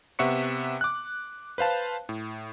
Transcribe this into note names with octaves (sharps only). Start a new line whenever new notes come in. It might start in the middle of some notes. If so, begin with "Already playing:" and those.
C3 B3 E5 F#5 C#6 C#7
D6 F#6
B4 C5 F5 A5
A2